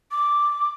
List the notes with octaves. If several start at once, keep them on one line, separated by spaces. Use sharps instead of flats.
D6